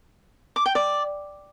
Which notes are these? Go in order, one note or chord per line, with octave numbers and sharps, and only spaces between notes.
D6
G5
D5